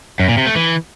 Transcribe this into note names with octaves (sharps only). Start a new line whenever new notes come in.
F#2
A#2
C3
A3
E3